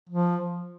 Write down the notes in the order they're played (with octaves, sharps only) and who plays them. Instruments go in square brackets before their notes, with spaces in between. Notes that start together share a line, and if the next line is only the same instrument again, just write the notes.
[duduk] F3